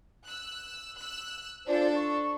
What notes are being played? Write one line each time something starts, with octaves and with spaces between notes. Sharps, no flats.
E6 F#6
E6 F#6
D4 F4 A4 C5 D5
C#6